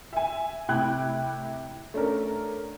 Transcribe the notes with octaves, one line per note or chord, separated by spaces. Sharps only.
E5 G#5
A2 C3 G5 B5 F#6 G#6
A3 C#4 D4 A#4